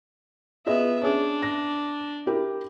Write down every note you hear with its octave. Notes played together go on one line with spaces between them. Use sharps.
B3 F4 G#4 D#5 E5
C#4 D4 G#4
A#6
E4 G4 A#4